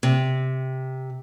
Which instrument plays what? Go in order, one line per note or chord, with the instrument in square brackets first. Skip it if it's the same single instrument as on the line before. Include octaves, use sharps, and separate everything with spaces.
[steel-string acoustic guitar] C3